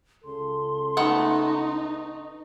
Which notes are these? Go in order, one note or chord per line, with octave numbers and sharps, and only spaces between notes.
C#2 C#3 A4 C6
A3 B3 D#4 F#5